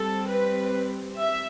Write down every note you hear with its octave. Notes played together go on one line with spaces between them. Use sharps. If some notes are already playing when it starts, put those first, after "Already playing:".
Already playing: G3 C4 A4
B4
E5